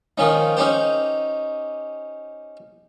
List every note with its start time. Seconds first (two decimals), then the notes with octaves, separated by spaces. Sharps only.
0.18 D#3 F3 C#4 D#4
0.57 C#4 D#4 G4 C5